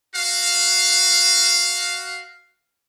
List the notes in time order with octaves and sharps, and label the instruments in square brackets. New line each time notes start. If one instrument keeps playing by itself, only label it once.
[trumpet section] F#4 F5